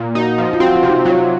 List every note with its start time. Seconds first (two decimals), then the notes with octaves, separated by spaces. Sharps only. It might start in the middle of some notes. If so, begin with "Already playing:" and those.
Already playing: A#2
0.15 D#4 F#4
0.38 F3
0.53 F4
0.60 C4 F#4
0.76 F4
0.83 C3
0.90 D#4
1.05 F#3 F4